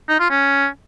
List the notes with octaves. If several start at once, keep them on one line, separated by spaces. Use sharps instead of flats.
D#4
F4
C#4